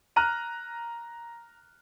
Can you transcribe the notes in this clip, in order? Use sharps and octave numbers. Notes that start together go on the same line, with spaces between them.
A#5 F6 F#6 D#7